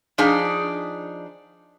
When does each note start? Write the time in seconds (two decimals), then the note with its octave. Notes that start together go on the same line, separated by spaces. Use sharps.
0.18 F3 D4 D#4 G#4